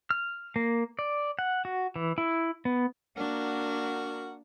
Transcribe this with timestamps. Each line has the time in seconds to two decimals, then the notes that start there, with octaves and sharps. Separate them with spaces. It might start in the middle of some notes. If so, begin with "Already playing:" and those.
0.11 F6
0.56 A#3
0.99 D5
1.39 F#5
1.65 F#4
1.96 E3
2.18 E4
2.65 B3
3.17 A#3 D4 F#4 A#4 F#5